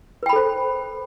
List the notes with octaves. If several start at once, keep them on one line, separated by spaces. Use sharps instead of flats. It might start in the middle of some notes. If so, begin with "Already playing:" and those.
A4 B4 C5 G5 B5